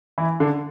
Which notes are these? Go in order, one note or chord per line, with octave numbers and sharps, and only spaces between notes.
E3 E4
D3 D4